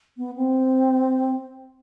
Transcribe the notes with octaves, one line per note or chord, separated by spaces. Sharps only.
B3
C4